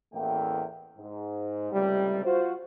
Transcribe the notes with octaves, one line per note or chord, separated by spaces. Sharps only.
A1 E2 A3 A#3 G5
G#2
C#2 A2 C3 G3
F4 F#4 C5